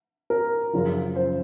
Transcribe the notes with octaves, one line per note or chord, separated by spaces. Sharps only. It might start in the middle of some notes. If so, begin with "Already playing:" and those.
A#4
F#2 C#3 F3
C5